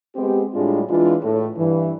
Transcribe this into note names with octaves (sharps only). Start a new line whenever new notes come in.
G#3 B3 C4 G4
A2 G3 G#3 D4 F4
E3 G#3 D4 F4
A2
G2 E3